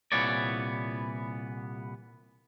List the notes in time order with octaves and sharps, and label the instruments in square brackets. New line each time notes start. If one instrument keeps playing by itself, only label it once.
[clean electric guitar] C2 A#2 E3 B3 C#5 D5